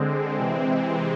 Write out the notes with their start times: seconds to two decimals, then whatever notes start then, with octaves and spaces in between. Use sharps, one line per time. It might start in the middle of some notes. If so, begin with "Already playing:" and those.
Already playing: D3 G#3 C4
0.38 C3 E3 G#3 C4